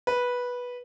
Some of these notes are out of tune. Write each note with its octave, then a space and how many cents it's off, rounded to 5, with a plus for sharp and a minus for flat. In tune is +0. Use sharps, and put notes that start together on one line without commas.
B4 -10